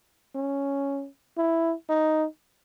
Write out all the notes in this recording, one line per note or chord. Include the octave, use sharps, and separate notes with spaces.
C#4
E4
D#4